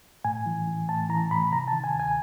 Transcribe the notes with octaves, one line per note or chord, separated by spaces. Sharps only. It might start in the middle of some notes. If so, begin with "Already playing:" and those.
A2 G#5
E3
E3
A2 A5
E3 A#5
A2 B5
C3 A#5
A5
D#3
G#5
D2 G#5